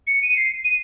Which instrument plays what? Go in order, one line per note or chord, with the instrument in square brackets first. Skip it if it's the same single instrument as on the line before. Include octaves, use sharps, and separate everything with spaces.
[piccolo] C#7
D#7
C7
D#7